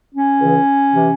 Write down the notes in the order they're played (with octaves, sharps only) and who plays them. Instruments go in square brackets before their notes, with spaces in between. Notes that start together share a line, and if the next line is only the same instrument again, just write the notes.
[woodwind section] C#4
C#2 C#3 E3
C3 E3